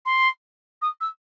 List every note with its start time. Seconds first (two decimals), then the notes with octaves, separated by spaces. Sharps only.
0.05 C6
0.82 D#6
1.00 E6